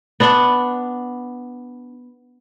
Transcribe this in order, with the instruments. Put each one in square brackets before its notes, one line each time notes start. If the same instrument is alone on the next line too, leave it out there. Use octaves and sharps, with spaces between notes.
[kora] B3 D4